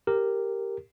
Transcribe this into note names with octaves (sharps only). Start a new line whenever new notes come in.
G4 A#4